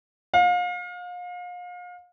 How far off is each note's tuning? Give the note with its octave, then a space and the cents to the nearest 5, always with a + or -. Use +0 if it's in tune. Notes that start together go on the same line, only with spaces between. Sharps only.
F5 +35